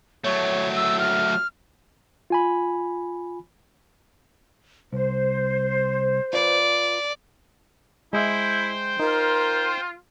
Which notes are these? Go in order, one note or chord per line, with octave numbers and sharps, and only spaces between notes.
F#3 A3 C#5
E6
F6
F4 G#5 B5
C2 C5
F4 B4 D5
G#3 E4 G#4 C5 E5 G5
D#4 F4 A#4